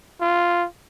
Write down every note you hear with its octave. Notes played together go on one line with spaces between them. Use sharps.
F4